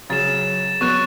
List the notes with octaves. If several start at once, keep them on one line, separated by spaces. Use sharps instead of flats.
C#3 F#3 A6 E7
F#3 B3 C#6 F#6 A6